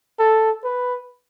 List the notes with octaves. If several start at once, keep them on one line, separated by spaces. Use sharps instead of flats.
A4
B4